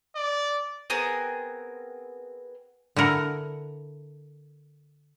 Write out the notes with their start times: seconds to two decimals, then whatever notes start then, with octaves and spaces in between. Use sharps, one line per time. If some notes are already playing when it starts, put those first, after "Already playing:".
0.16 D5
0.90 B3 C4 G#4 A#4
2.96 D3 E4 A#4 F#5